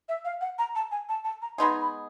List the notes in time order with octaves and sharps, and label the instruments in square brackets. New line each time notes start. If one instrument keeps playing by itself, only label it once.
[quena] E5
F5
F#5
A#5
A5
G#5
A5
A5
A#5
[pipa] G#3 B3 D#4 G#4 [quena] C6
[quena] B5